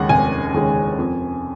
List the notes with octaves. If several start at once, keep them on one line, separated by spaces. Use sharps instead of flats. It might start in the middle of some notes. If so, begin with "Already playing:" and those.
Already playing: D#2 C#3 G#3 C#4 F#5
F1 G#5
D#2 C#3 G#3 C#4
F2